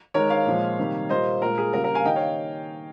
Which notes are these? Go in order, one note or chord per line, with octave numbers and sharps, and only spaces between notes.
D#3 G#3 A#4 C#5
C#5 F5
A#2 F3 G#3
C3 D#3 G3 A#3
A#2 G3 A#3 C5 D#5
A#2 G#3 A#4
G#4
C#3 G3 A#3 A#4
A#4
F5 G#5
D#3 G3 A#3 D#5 G5
C#5 F5